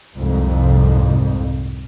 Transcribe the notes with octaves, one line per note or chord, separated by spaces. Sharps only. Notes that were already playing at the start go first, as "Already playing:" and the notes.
C2 F2 G#2